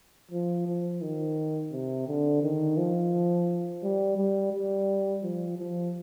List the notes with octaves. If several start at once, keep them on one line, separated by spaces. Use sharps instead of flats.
F3
F3
D#3
C3
D3
D#3
F3
G3
G3
G3
F3
F3